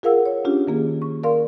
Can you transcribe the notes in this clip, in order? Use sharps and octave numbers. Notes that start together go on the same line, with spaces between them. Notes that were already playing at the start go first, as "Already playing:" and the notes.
F4 G#4 A#4 F5 F#5 E6
C#5
C#4 D4 F4 G4
D#3 A#3 G#4
C#6
A#4 D5 F5 C6